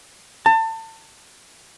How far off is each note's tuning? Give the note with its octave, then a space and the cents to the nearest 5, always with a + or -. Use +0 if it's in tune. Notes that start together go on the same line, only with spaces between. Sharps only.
A5 +30